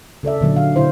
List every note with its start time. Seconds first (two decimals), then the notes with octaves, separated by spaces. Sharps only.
0.23 C#3 A4 D5 E5
0.41 A#2 D3 F#3 E5
0.56 F5
0.76 B2 D3 E4 C5